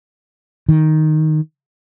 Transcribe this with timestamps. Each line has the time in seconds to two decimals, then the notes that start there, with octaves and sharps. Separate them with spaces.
0.69 D#3